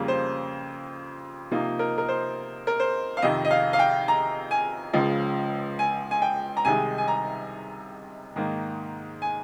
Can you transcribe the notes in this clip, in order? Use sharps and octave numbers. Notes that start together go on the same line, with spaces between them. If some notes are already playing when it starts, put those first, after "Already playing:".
Already playing: F2 C#3 G3 A#3
C5
C3 F3 A#3 D#4
A#4
A#4
C5
A#4
C5
F5
F2 C3 D#3 D#5
D#5
F5
F5
G5
A#5
G#5
C#2 C#3 F3
G#5
G#5
G5
A#5
C2 C3 D#3 G#3 D#4 G#5
G#5
A#5
G#2 D#3 A#3
G#5